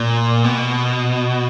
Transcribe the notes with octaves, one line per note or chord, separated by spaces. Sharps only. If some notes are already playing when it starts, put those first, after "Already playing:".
Already playing: A#2
B2